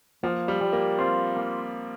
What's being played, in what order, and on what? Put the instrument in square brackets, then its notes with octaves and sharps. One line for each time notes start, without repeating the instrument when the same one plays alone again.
[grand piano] F3 [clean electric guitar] A#3
[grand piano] G3
[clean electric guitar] G3
[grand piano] A#3
[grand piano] C4 [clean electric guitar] F4
[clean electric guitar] A#3